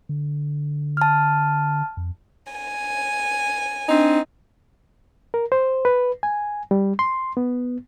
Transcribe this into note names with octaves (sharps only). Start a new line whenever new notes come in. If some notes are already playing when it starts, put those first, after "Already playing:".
D3
A5 F6
F2
G#5
C4 D4 D#4
A#4
C5
B4
G#5
G3
C6
B3